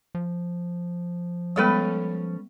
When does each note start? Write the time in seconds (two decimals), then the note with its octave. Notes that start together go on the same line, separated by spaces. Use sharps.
0.15 F3
1.56 G3 G#3 B3 C#4 A4 B4